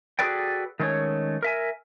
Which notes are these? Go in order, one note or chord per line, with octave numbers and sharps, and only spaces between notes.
F#4 G#4 A4 B4 D5 G5
D#3 G#3 A3 C#4 C#5
A#4 E5 G#5